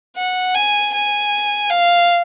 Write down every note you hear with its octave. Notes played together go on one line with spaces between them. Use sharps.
F#5
G#5
G#5
F5